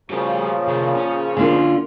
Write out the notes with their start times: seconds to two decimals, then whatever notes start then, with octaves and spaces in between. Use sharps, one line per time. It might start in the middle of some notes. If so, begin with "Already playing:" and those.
0.10 A#2 C#3 F3 G3 F#4 G4
0.67 C3 G#4
0.96 C#4
1.37 D3 A#3 F4